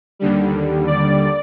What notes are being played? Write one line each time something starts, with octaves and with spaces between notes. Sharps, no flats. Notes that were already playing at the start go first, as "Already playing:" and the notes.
D#2 D3 G3
D5